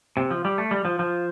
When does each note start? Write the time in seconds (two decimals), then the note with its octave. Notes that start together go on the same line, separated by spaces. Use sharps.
0.17 C3
0.31 F3
0.45 G3
0.58 A3
0.71 G3
0.85 F3
0.99 F3